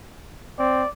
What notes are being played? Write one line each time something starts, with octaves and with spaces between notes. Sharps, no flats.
C4 D5